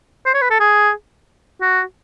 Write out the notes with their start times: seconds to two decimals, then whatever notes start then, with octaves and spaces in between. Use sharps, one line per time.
0.26 C5
0.34 C#5
0.42 B4
0.50 A4
0.60 G#4
1.61 F#4